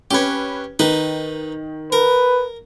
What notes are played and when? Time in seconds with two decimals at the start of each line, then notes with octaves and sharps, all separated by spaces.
0.11 C#4 G4 B4 C#5
0.79 D#3 D#4 B4
1.92 A#4 B4